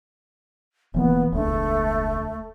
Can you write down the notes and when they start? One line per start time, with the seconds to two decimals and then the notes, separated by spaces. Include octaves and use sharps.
0.94 E1 E3 A#3 B3
1.32 E1 C#2 A3 D4